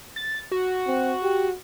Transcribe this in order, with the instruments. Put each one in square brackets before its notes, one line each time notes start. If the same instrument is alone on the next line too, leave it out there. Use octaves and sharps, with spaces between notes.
[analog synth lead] A6
F#4
[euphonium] C4
G4